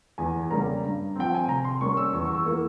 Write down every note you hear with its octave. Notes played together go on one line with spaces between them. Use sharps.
E2 G#5
C#3 G3 A#3 A#5
G2
F3 C4 G5
G#5
C3 A#5
C6
G3 A#3 C#4 C#6
E6
E2 C#6
C#6
E6
E3 A#3